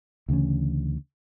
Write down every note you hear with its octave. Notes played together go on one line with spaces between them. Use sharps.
D2 C#3 E3 C#4